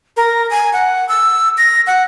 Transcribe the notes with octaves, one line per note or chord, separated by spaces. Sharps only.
A#4
G#5
F#5
E6
A#6
F#5